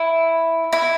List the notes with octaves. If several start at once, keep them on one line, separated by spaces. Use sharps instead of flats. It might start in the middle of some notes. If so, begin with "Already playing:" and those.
Already playing: E4
E4